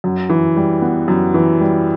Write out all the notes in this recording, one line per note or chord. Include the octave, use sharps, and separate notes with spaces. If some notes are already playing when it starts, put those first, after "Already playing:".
F#2
E3
G3
B3
F#2
E3
G3